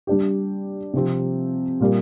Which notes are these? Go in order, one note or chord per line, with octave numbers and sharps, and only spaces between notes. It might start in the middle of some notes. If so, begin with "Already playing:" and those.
G3 D4 G4
C3 F3 C4 G4
A#2 G3 A#3